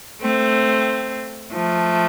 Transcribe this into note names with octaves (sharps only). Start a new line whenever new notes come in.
A3 C4
F3 A3